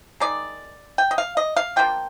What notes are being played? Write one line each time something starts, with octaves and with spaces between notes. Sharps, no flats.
D#3 G#3 D#4 D5
G5
D#5
F5
D#5
F5
F3 A#3 D4 F4 G5